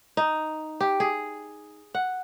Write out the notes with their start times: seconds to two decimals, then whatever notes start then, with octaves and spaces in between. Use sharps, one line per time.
0.17 D#4
0.80 G4
1.00 G#4
1.94 F#5